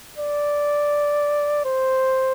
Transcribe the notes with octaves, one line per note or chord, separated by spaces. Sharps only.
D5
C5